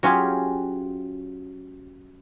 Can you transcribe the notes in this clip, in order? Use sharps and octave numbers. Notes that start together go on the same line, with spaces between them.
F#3 C#4 F4 G4 G#4